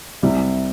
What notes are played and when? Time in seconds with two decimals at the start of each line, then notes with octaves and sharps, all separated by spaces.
0.22 C2 C3 G3